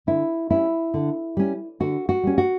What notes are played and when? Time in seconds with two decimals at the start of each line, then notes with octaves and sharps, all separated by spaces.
0.07 D3 E4
0.50 G3 C#4 E4
0.94 D3
1.37 G3 C#4
1.80 D3 F#4
2.09 F#4
2.23 G3 C#4
2.38 F#4